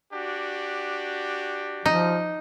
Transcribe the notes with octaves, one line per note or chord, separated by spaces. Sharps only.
D4 F#4 G4
F3 D#4